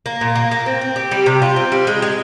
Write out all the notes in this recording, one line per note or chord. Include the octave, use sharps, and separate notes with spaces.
A#3
A#2
A#3
A#3
C4
C4
G4
G3
C3
F4
C4
G3
G#3
G#3